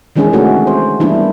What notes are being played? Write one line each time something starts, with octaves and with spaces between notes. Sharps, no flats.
D#3 E3 G#3 C#4 D4 G#4
C3 A3 F#4 G#4
C5
E3 G3 A#3 B3 D4 E4